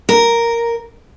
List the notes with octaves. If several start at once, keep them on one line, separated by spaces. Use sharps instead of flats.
A#4